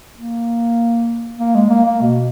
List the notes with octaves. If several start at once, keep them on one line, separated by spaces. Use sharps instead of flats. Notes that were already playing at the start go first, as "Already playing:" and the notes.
A#3
A#3
G#3
A#3
A#3
B2